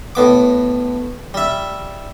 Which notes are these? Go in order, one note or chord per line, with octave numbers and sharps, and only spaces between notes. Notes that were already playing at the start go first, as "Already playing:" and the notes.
A2 B3 D6
G3 E5